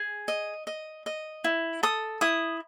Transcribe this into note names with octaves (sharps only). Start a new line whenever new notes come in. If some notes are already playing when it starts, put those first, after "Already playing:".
Already playing: G#4
D#5
D#5
D#5
E4
A4 D#6
E4 D#6